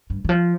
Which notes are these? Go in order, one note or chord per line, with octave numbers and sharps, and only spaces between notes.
G2
D#3
F3